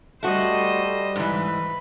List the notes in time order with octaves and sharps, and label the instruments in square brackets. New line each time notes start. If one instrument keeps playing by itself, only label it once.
[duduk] G3 [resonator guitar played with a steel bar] A3 F#4 [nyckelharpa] C5 D#5
[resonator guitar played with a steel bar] G#2 E3 [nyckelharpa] B4